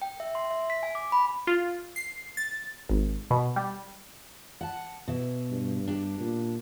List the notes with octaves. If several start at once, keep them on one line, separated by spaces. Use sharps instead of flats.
G5
E5
C6
E5
B6
G#5
D6
B5
F4
C7
A6
G#1
B2
G3
F#5 A5
B2 E5
G2
D4 G4
A#2